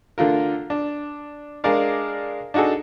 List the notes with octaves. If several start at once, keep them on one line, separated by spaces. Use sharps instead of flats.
D3 A3 F4 A#4
D4
G#3 D4 G#4 A#4 D5 F5
D4 D#4 F#4 G#4 A4